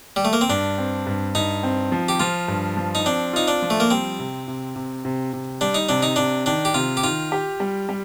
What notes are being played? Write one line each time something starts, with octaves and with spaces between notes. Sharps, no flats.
G3
A3
A#3
C4
G2 D4
C4
G2
G2 D#4
C4
F3
G4
F3 F4
G2
F3
D#4
C4 D4
D#4 F4
D4
F3
A3
A#3
G3 C4
C3
C3
C3
C3
C3
G3 D4
D#4
C3 D4
D#4
C3 D4
D#3 D4
G4
C3 F4
G4
D#3 F4
G4
G3
G3